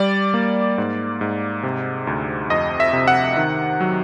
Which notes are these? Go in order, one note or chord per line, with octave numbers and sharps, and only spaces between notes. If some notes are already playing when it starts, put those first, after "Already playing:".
Already playing: G3 D5
A#3
G#2
G#2
C3
D2
F2 D#5
E5
C3
F#5
D#3
F#3